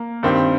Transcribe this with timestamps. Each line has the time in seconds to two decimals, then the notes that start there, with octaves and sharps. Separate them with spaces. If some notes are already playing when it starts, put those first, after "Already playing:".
Already playing: A#3
0.23 G2 D#3 C4 G4